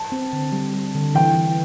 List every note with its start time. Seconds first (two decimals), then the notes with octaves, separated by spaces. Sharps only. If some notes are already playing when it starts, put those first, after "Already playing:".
Already playing: A5
0.12 C4
0.33 D3
0.52 G3
0.74 G3
0.95 D3
1.15 E3 G5
1.35 E3